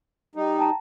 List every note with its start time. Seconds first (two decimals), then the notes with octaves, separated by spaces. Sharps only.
0.35 G3 D#4
0.58 G5 A5 A#5